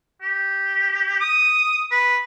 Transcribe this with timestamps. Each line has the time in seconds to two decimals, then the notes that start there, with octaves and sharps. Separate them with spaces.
0.22 G4
1.20 D#6
1.91 B4